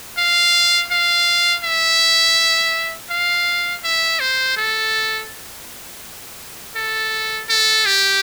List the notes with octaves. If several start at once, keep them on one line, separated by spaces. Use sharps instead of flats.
F5
F5
E5
F5
E5
C5
A4
A4
A4
G4